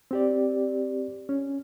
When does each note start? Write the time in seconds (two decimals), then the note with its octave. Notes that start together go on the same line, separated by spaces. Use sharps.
0.11 C4 G4 D5
1.29 C#4